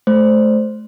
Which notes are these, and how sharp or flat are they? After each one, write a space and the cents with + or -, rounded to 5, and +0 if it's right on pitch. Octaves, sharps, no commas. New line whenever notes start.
A3 -30 C5 +0